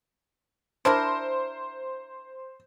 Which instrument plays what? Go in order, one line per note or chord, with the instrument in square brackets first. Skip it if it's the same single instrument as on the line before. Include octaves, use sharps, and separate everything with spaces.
[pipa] D4 E4 A#4 [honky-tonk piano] C5